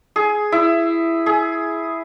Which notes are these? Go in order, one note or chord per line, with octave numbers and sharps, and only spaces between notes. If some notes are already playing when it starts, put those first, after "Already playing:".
G#4
E4
G#4